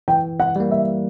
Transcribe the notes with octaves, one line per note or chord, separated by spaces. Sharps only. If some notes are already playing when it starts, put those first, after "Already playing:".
E3 G5
F#5
G3 A#3
E5